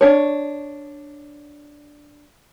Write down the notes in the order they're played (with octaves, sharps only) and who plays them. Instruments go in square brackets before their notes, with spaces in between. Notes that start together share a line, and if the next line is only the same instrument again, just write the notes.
[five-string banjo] D4 C#5